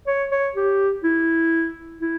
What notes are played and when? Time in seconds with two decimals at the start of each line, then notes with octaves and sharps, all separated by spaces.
0.07 C#5
0.32 C#5
0.56 G4
1.04 E4
2.01 E4